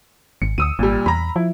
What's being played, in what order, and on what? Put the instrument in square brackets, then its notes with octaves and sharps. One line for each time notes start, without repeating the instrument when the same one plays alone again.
[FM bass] G#1 [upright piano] C#7
[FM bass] D2 [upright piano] D#6 E6 D#7
[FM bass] G#1 [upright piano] A#2 G3
[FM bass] E2 [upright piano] A#5 B5
[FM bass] F3 [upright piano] E4